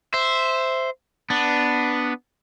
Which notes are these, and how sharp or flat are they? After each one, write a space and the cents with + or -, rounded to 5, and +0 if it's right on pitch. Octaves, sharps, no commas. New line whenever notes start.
C5 -5 E5 +0
B3 +0 D4 +0